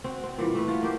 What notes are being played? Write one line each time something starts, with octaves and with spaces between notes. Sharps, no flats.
C4 F#4
C4
A#2 E3 G3
A3 B4
F4 F#4 C#5
A#3 G4 C5